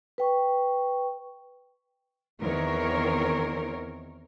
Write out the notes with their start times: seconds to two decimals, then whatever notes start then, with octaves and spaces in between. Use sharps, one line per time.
0.18 B4 G5 C#6
2.40 E2 D#3 C4 A#4 C#5